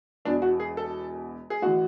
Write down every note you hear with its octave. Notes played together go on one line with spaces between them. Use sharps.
E1 E2 B2 D4
F#4
G#4
A4
G#4
A1 E3 F#4